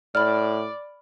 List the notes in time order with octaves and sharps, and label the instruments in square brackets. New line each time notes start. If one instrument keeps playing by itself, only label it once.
[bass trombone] A2 [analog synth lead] D5 [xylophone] B5 F6